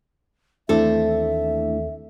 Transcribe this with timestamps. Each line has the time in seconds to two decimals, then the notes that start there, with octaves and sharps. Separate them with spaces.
0.69 D#2 E3 A3 C4 D4 E4 A4 E5